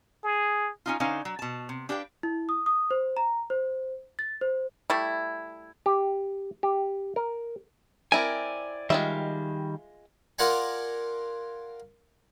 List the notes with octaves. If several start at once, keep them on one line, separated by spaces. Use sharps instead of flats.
G#4
C#4 D#4 F4
D3 C#4 D#4 C5 F5
F#3
B2 A5
C3
D4 G4 B4 F5 G5
E4
D#6
D#6
C5
A#5
C5
A6
C5
G3 A3 E4
G4
G4
A#4
C4 E4 A#4 D5 G#5
D#3 G3 G#3 F4 E5
F4 A#4 D5 F5 F#5 G#5